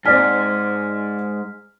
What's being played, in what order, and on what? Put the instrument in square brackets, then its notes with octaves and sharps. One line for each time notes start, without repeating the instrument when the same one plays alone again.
[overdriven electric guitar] G#2 [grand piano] C4 D5 G#5 [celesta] F6 B6